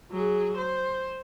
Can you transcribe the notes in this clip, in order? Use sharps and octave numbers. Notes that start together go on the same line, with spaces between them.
F#3 G#4
C5